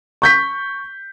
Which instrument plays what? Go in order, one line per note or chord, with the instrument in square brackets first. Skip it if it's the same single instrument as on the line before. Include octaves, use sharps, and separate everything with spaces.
[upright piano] C#6 G6 B6